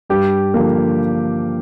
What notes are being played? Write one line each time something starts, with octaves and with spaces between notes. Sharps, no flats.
G2 G4
D3 F3 A#3